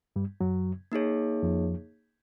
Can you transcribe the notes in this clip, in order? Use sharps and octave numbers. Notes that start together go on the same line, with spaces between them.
G2 G3
F#2 F#3
A#3 D#4 G#4 C#5
F2 F3